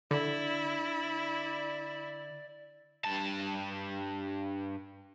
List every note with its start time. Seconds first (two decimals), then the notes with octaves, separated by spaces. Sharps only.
0.11 D3 E4 D5
3.05 G2 A5